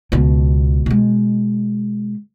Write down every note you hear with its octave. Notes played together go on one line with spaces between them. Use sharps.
C#2 B2
B2 G#3